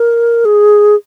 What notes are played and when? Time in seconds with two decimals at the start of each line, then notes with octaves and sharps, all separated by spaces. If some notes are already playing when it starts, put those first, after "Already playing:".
Already playing: A#4
0.45 G#4